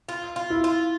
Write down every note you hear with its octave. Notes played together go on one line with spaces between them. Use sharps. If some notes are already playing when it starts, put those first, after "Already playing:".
F4
F4
E4
F4